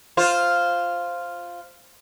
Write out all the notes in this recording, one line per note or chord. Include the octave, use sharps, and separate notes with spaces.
F4 C5